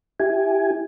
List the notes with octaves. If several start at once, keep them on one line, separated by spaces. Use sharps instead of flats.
E4 G4 G#5